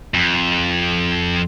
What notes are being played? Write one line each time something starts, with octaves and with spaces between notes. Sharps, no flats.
F2